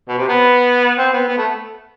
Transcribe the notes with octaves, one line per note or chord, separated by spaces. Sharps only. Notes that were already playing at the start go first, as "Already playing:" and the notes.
B2
C3
B3
C4
B3
B3
A3